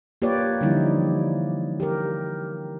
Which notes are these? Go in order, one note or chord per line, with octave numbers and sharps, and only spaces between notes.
A#3 F4 G4 B4 C#5 D5
D3 E3 F3 G3 D#4 E4
G4 A#4